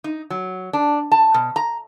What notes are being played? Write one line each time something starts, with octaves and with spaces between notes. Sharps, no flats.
D#4
F#3
D4
A5
B2
A#5